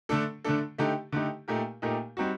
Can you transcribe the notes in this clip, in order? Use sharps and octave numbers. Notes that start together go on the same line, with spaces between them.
D3 A3 D4 A4
D3 A3 D4 A4
D3 A3 D#4 G4
D3 A3 D#4 G4
A#2 A3 D#4 G4 A#4
A#2 A3 D#4 G4 A#4
G3 C4 D#4 F#4